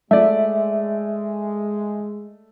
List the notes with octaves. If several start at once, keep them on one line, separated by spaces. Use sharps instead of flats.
G#3 A3 D5 E5